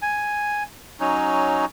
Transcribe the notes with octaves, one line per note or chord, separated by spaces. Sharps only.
G#5
F#3 C#4 D#4